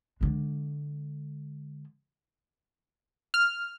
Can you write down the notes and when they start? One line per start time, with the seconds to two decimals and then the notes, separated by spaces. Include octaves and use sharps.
0.21 D3 G#3
3.34 F6